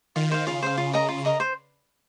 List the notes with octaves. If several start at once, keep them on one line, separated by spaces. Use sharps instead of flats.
D#3 F4
C5 F5
C#3 F4
C5 F5
F4
A#4 D#5 A#5
F4
A#4 D#5 A#5
C5